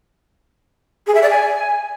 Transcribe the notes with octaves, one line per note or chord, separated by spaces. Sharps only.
G#4
E5
D5
G#5